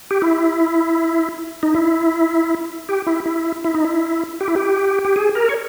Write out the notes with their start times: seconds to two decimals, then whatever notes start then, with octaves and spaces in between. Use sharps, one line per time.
0.11 G4
0.22 E4
1.63 D#4
1.75 E4
2.89 G4
3.07 E4
3.26 E4
3.64 E4
3.74 D#4
3.85 E4
4.41 G4
4.48 E4
4.56 G4
5.05 G4
5.16 G#4
5.35 A#4
5.49 C#5